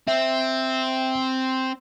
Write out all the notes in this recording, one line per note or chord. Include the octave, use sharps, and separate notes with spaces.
C4 E5